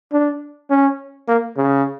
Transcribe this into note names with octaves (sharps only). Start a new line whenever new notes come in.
D4
C#4
A#3
C#3